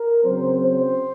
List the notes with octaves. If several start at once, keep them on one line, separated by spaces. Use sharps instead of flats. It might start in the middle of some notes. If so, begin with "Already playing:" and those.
Already playing: A#4
C#3 F#3 C4 C5
C5